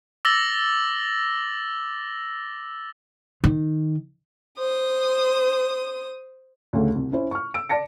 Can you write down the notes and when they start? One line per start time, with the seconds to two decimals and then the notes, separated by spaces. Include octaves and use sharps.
0.25 D6 E6 A6 A#6 F#7 G7
3.44 D#3
4.59 C5 D#6
6.73 D2 C#3 A3
6.95 C2
7.12 C#4 E4 C5
7.31 C#6 F6
7.54 E6 D7
7.69 D5 A5 A#6 C#7